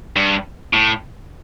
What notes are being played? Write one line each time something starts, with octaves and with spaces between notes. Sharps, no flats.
G2
A2